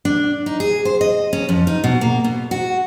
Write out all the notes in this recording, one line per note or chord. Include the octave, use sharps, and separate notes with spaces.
D4
D#4
G#4
C5
D#5
C#4
F2
D#4
B2
A#3
B2
F#4